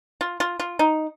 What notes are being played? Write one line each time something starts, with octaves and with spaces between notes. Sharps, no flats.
F4
F4
F4
D#4